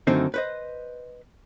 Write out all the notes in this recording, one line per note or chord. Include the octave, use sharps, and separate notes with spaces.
F#2 D3 D#3 A3 C4 D#4
B4 C5 D#5